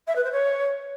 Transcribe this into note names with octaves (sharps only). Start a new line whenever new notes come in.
E5
B4
C5
C#5